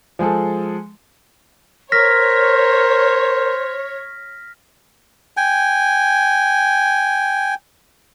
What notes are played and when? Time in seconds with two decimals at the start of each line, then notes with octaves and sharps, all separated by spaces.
0.19 F3 G#3 G#4 A4
1.92 A#4 C5 C#5 F6 A#6 B6
5.37 G5 G#5